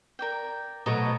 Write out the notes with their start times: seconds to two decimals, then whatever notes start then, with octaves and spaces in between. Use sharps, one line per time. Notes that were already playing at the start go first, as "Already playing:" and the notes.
0.19 A#4 D5 G5
0.86 B2 F#3 A3 D#5 A#5